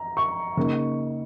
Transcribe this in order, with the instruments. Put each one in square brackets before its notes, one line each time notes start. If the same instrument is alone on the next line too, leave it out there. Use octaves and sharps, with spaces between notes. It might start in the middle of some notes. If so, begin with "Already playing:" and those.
Already playing: [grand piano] A#5
C#6
C#3 A#3 D#4